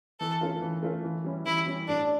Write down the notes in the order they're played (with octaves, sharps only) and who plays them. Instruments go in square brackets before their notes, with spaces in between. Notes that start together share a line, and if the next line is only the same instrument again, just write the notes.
[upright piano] E3 [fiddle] A4
[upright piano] A3 C#4 F4 A#4
E3
A3 C#4 F4 A#4
E3
G3 C#4 E4
[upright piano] E3 [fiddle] E4
[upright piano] G3 C#4 E4
[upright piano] A2 [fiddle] D4